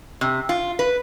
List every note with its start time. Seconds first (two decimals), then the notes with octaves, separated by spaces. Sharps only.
0.21 C3
0.49 F4
0.79 B4